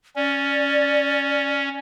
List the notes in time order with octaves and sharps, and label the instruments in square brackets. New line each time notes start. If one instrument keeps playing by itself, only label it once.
[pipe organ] C#4 [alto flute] D5